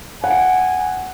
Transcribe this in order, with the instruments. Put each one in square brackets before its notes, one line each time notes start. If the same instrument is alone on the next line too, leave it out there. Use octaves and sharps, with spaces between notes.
[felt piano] F#5 [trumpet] G#5